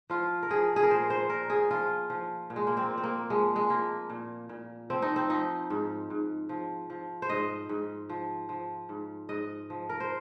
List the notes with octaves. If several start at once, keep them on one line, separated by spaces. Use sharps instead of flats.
F3 F4
A#4
F3 G#4
G#4
A#4
A#2 C5
C5
A#2 A#4
G#4
F3 F4
F3
A#2
G#3
A#3
C4
A#2
C4
A#3
F3 G#3
G#3
F3 A#3
A#2
A#2
F3 C4
D#4
C4
F3 D#4
G#2
G#2
F3
F3
C5
G#2 D#5
G#2
F3
F3
G#2
G#2 D#5
F3
A#4
C5